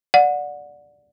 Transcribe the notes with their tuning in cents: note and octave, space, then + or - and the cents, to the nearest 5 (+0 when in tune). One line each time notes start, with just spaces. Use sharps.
D5 +0 F#5 -25